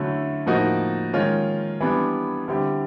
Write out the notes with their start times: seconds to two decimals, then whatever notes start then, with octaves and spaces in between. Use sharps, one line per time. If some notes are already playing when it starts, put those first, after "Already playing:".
Already playing: D3 F#3 A3 C#4 E4
0.46 A2 F3 A#3 D#4 F#4
1.13 D#3 G#3 C#4 F4
1.80 E3 G3 B3 D4
2.48 D3 G3 C4 E4 G4